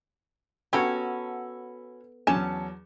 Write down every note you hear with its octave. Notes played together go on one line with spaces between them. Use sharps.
B3 C#4 F#4 G4 A4 A#5 B5 E6
E2 F#3 C#4 G#5 A5